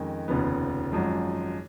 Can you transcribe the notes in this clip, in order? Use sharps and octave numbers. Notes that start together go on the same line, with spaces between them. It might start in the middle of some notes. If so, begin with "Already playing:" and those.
Already playing: F2 D#3 G#3 C#4
F1 D#2 C#3 F3 B3
G#1 F#2 F3 G#3